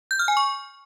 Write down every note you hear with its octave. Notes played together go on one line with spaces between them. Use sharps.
G6
F6
G#5
C#6